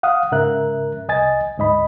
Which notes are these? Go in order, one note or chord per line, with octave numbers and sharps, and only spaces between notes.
F5 F#5 D#6
G#2 C#3 A#4 E5 F#6
C2 D#5 G#5 A6
D2 G#2 D#5 B5